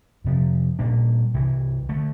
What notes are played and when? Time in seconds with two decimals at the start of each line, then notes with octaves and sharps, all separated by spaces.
0.24 F2 C3 F3
0.79 A#2 G3 A#3 D4
1.34 C2 C3 E3
1.89 D3 A3